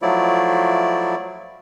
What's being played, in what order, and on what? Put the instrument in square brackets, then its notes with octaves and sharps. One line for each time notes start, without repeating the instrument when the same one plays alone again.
[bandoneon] F3 F#3 A3 E4 D5